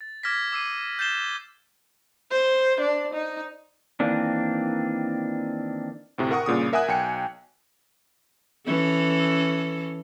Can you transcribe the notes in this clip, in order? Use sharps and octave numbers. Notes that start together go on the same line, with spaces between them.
A6
D6 F6 G#6 A#6 B6
D6 E6 C7 D#7
G6 A6 C7 E7 G7
C5
D4
D#4
D#3 E3 A#3 C4 D4
D2 A2 C3
A#4 F#5 C#6 D#6
G2 A#2 C#3 D#6
A#4 E5 F#5 G#5 D#6 F#6
B1 G5 G#5 C#7
E3 C#4 A4